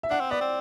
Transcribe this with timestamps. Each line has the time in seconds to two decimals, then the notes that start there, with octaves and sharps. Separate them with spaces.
0.03 E5
0.10 D4 F#5
0.20 C4
0.31 B3 D5
0.41 C4